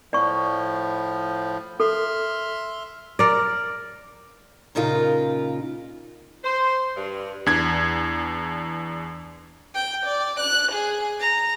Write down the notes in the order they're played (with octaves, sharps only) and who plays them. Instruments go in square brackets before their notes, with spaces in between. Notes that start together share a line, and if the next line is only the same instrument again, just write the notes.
[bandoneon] A2 F3 [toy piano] D5 C#6
[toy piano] A4 [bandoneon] E5 C6 F6
[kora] A#4 D5
[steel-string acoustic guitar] A#2 C#3 D#4 F4 A#4
[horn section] C5
G2
[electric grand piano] E2 D4 G#6
[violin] G5
D5
F#6
G#4
A#5